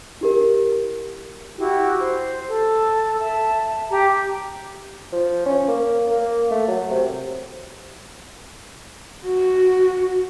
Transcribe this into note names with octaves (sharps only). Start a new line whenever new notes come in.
E4 G4 A#4
E4 F#4 G4
C5
A4
E5 A5
G4 A#5
F3
C#4
A#3
A#3
A3
F#3
C3
F#4